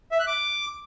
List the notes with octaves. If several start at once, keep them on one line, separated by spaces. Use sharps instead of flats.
E5
F#6
D6